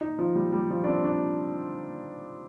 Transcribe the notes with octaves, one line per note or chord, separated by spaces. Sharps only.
D#4
F3
G3
G3
F3
D4
C4
D4